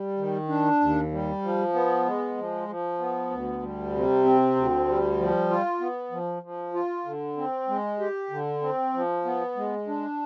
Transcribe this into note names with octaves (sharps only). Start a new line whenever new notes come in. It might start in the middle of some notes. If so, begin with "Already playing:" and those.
Already playing: G3
D#3
D4
D#2
G3
F3
B3
G#3
F3
F3
B3
D2
G3
C3
C4
D2
G3
F3
F4
B3
F3
F3
F4
D3
C4
G#3
G4
D3
C4
F3
B3
G#3
D4